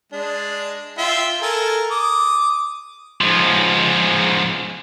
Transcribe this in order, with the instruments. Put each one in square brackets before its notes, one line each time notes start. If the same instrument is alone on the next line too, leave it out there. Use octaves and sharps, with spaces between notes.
[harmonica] G#3 D4
F4 E5 G5
A4 A#4 G#5
D6 D#6
[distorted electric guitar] G#2 F3